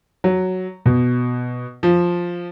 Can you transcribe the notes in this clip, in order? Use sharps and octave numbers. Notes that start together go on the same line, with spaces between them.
F#3
B2
F3